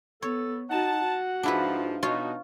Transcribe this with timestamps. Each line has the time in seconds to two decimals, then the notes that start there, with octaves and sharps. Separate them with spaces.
0.22 B3 A4 C#5
0.70 D#4 F#4 F#5 A5
1.01 F#4
1.43 G#2 F3 D4 E4 B4
2.03 B2 D#4 F4 F#4 C#5